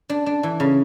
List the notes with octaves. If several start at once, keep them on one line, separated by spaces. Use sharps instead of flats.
D4
D4
E3
C#3